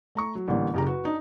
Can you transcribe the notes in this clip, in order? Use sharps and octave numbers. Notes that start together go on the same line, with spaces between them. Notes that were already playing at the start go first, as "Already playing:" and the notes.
A3 A#5 C#6
F#3
A1 D3 G3 A#3
F#1 C#3 G4 A#4 A#5
F#4 B4
D4 D#4